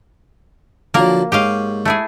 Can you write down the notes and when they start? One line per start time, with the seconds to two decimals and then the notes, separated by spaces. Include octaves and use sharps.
0.94 D3 F3 F#3 A#3 A#4
1.32 G#2 G4 C#5 D#5 F5
1.85 A3 E4 G#4